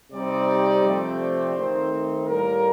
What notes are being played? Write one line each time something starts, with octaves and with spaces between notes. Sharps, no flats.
C3 G3 C4 D#4 D5
C3 F3 A3 C4
D5
D#3 A3 C4 D#4 C5
A2 G3 A#3 A#4